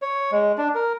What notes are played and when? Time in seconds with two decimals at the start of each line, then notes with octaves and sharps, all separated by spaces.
0.02 C#5
0.32 G#3
0.58 D4
0.75 A#4